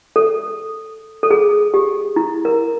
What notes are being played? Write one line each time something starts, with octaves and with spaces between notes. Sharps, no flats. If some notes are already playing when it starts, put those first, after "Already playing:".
A4
A4
G#4
G4
E4
A#4